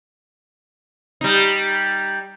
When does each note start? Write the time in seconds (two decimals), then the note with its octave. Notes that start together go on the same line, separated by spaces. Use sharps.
1.21 G3 D#4